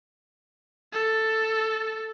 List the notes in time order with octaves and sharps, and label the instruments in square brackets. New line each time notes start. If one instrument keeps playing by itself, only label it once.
[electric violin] A4